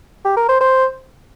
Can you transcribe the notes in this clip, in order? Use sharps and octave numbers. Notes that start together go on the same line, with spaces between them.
G4
A#4
C5
C5